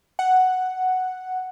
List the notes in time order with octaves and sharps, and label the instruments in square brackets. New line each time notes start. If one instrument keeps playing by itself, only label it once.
[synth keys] F#5